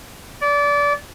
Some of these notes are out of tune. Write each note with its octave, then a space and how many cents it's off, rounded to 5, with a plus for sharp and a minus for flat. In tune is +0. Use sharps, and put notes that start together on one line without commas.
D5 -25